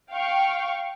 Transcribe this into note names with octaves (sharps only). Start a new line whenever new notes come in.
F5 G5 C#6